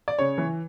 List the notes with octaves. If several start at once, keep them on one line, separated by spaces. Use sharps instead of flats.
D5
C#3 C#5
E3